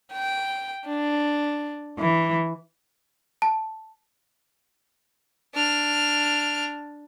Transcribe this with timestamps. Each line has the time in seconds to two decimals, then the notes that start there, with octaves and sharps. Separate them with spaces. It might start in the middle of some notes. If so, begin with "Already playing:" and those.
0.13 G5
0.86 D4
1.98 E3
3.42 A5
5.54 D4 F6